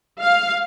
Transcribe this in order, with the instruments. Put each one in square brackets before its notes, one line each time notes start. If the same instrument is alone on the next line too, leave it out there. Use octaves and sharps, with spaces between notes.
[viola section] F5